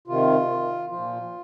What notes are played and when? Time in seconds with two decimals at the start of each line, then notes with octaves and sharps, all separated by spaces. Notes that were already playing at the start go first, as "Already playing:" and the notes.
0.07 C3 D#3 F4
0.90 A#2 F3 F4